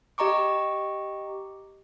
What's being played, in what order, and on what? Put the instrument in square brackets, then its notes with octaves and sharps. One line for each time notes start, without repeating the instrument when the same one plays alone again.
[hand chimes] G4 D#5 A#5 C#6 D6